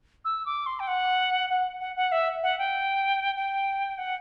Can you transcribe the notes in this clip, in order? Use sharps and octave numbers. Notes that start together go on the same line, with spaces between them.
E6
D6
C6
G5
F#5
F#5
F#5
F#5
E5
F#5
G5
G5
F#5